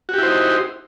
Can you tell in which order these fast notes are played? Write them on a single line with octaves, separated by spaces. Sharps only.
F#4 G4 E4 C5 D#4